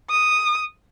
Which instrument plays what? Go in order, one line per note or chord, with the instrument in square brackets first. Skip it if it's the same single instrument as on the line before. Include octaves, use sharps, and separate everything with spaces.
[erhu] D#6